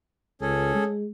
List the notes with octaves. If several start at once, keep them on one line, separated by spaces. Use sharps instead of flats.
C#2 C#4 G#4 A4
G#3